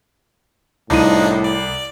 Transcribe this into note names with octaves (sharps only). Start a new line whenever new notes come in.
C2 A2 F3 D4 D#4 D#7
D5